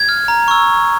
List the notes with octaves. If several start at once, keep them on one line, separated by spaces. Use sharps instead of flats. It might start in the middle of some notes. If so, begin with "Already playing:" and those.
Already playing: G#6
F6
A#5
C#6 E6